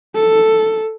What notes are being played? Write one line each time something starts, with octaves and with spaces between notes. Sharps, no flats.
A4